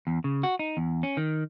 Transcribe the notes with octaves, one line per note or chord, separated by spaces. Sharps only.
E2
C#3
F#4
D#4
E2
C#4
D#3